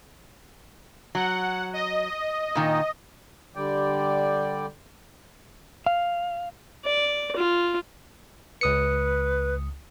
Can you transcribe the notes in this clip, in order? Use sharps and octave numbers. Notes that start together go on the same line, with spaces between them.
F#3 F#5
D#5
A#2 D#3
D3 G3 D5 G5
F5
D5
F4
C#2 B4 D#6 C#7